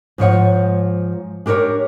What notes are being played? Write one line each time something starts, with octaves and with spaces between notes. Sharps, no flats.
G#2 F3 C#5 F#5
D4 G4 A#4 B4 C#5